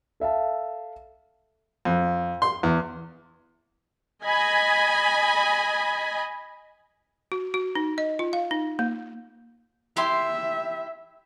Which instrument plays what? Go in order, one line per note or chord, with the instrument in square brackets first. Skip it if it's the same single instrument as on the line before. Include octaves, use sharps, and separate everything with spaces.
[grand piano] A4 E5 F5 A5
[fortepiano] F2
C6
E2
[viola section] D#5 G#5 B5
[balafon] F#4
F#4
D#4
D#5
F4
F5
D#4
A#3
[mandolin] E4 G4 C6 [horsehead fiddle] E5